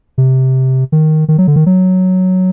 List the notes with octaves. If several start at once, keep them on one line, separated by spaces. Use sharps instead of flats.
C3
D#3
D#3
F#3
D3
D#3
F#3